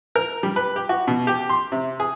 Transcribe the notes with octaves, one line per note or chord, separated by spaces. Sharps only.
A#4
G3
B4
G4
F#4
B2
G4
C6
C3
G#4